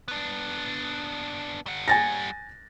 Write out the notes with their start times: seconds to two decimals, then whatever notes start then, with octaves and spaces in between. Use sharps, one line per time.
0.08 B3 D4
1.66 G3 F#5
1.88 G#5 A6 A#6